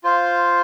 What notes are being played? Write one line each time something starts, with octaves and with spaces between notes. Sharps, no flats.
F4 C5 F5